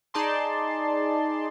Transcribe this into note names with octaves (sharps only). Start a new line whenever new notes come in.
D#4 G#4 D5 A5 C6